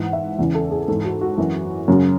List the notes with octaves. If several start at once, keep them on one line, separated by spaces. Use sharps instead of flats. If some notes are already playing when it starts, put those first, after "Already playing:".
Already playing: G#2 E3 F#5
E5
E2 C#3 E3
A4
G#4
G#2 E3 A4
F#4
F#4
F#2 E3
F#2 C#3 F#3